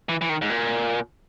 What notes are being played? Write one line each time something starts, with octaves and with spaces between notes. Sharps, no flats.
E3
E3
D#3
G#2
A#2